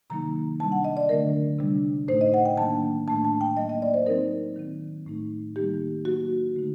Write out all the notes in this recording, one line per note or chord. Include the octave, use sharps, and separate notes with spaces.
C3 D#3 F#3 A#3 D#4 A#5
C3 G3 D4 A5
F#5
D#5
D5
D3 F#3 A3 D4 A#4
C3 G3 D4
A2 A3 D#4 C5
D#5
F#5
G5
D#3 F#3 A#3 D4 A5
A2 A3 D4 A5
A5
G5
F#3 A#3 D#4 D#5
D#5
D5
C5
F#3 C4 D#4 A#4
D#3 F#3 C4
A2 A3 D#4
D#3 G3 A#3 D#4 G4
F#3 A#3 D#4 F#4
D3 A3 D#4